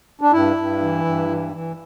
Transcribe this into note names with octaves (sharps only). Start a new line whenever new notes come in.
D4
G2 E4
G2
E3
G2
E3
E3